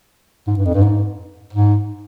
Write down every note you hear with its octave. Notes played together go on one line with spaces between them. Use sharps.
G#2
G2
F2
G2
G#2
G#2